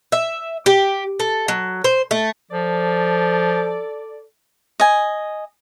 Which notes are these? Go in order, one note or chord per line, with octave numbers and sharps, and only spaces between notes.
E5
G4
A4
F#3
C5
A3
F3 A4 D5
D#5 G#5